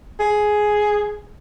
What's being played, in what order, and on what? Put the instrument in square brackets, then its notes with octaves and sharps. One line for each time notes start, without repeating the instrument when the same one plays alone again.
[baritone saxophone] G#4